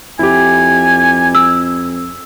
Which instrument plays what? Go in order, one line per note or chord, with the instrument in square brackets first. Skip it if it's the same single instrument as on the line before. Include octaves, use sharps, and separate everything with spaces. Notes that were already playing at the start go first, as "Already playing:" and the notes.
[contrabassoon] F2 [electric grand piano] E4 G4 [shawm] G#5
[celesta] E6